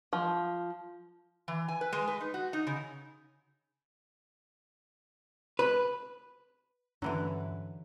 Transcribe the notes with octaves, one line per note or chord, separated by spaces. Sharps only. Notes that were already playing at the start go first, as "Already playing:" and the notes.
F3
E3
G#5
B4
G#3
B4
D#4
F#4
D#4
C#3
B4
G2 D3 E3 F#3 C#4 B4